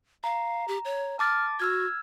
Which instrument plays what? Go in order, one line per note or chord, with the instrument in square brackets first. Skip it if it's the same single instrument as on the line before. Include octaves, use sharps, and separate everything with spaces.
[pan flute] F5 [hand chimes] A#5
[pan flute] G4
C#5
[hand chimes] A5 D6 A6 [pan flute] F6
[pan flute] F#4 [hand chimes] E6 F6 G#6